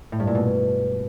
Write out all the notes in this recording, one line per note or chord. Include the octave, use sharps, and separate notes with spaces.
A2
G2
A#2
B2